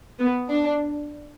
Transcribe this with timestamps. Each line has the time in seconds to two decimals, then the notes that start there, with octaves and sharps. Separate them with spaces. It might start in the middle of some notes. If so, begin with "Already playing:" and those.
0.19 B3
0.49 D4